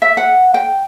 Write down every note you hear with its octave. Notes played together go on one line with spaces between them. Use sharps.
E5
F#5
G5